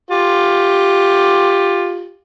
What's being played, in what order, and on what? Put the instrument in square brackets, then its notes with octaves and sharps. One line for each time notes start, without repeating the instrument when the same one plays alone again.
[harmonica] F4 G4